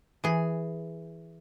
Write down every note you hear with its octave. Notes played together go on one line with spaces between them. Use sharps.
E3 G#4